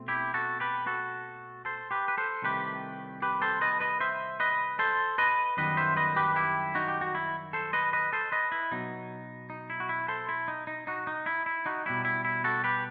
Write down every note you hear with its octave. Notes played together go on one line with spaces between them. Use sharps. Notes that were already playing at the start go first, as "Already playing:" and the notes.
Already playing: B2 A3 C4
E4 G4
F#4 A4
G4 B4
F#4 A4
A4 C5
G4 B4
B4
A4 C5
C2 C3 D#3 A3 G4 B4
G4 B4
A4 C5
B4 D#5
B4 D#5
C5 E5
B4 D#5
A4 C5
B4 D#5
F#2 D#3 G3 B3 B4 D#5
C5 E5
B4 D#5
G4 B4
E4 G4
D#4 F#4
G4
F#4
E4
A4 C5
B4 D#5
B4 D#5
A4 C5
B4 D#5
E4
B2 F#3 B3 D#4
D#4
E4
F#4
E4
A4 C5
E4
D#4
D#4
D#4 F#4
D#4
E4
E4
D#4 F#4
B2 G3 B3 E4
E4
E4
F#4 A4
G4 B4